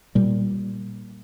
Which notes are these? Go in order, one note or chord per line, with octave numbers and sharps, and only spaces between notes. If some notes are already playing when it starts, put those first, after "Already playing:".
A#2 G3